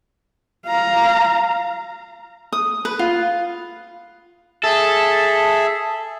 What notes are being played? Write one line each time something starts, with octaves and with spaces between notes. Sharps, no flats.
F5 A#5
D#6
B4
F4
G#4 A4 E5